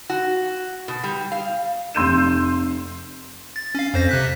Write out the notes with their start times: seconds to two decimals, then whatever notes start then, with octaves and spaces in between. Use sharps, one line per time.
0.10 F#4
0.88 B2
1.04 G3
1.32 F5
1.95 F1 C6 E6 G6 D#7 E7
3.56 A6
3.75 C#4 F5
3.94 F2 C5 A#6
4.09 C3 F#6 B6